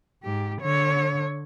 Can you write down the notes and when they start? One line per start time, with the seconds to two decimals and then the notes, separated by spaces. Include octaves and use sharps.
0.24 G#2 G4
0.61 D3 C#5